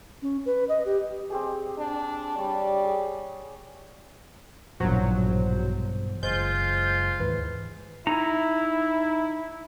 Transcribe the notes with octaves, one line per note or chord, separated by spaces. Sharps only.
C#4
B4
D#5
G4
C4 G4 G#4
D4
G3 C#5 D5
G#4
A#1 G2 B2 E3 F#3 C5
F#1 G#3 F4 C5 G6
D#2 G#2 E3 B4
D#4 E4 A#5